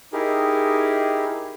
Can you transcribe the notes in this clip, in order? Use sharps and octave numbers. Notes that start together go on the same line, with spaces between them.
D#4 E4 G4 G#4 A#4